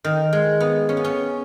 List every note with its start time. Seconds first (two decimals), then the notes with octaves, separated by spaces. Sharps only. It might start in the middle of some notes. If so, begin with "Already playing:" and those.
0.04 D#3
0.33 G#3
0.60 B3
0.89 C#4
0.97 B3
1.04 C#4